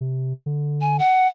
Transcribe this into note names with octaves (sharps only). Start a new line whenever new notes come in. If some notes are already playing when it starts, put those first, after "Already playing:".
C3
D3
G#5
F#5